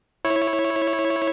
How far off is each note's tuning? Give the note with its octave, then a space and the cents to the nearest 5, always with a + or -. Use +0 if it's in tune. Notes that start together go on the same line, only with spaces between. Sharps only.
E4 -5 C#5 -10